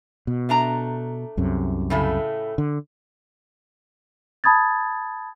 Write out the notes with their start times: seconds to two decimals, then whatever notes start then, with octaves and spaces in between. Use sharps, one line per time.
0.27 B2
0.49 A3 D4 A#5
1.37 C2 F#2 C3
1.90 A2 C#3 A3
2.58 D3
4.44 A5 B5 D#6 G#6 A6